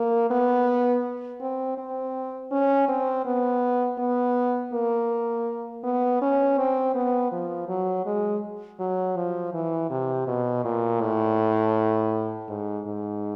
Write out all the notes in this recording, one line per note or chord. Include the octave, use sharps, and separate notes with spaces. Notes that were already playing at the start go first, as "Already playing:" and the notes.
Already playing: A#3
B3
C4
C4
C#4
C4
B3
B3
A#3
B3
C#4
C4
B3
F3
F#3
G#3
F#3
F3
E3
C3
B2
A#2
A2
G#2
G#2